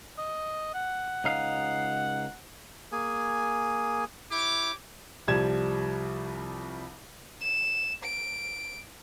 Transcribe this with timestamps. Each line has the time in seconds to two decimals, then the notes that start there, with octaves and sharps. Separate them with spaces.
0.18 D#5
0.74 F#5
1.24 C#2 D#4 F5
2.92 A#3 G#4 G#5
4.31 E4 G4 C#5 D6
5.28 C2 F3 G3 G#6 E7
7.41 E7
8.03 D7